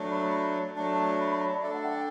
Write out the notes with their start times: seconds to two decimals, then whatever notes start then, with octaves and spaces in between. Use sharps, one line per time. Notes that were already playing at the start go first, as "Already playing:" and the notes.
Already playing: F#3 A3 D4
0.11 B5
0.76 F#3 A3 D4 A5
1.20 B5
1.30 B5
1.41 A5
1.52 D5
1.63 D4 A4 D5 E5
1.74 F#5
1.84 G5
1.95 G5